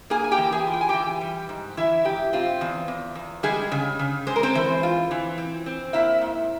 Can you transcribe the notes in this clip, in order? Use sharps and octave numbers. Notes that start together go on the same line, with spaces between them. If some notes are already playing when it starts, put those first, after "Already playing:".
A#3 G#4 G#5
G#5
G4 G5
E3
G#4 G#5
F4
G5
G#5
E3 G4 G5
G3
G#2
E3 E4 E5
G#2 G4
C4 F4
E2
E2
E2
G3 G#3 G#4
C#3
C#3
G#3 C5
A#4
C4 C5
E3
F4
E3
C4
C4
A#3 E4 E5
G#2